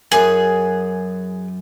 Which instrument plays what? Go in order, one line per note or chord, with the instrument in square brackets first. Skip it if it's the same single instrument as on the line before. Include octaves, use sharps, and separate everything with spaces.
[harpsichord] F#2 F#4 G#5 [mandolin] G#4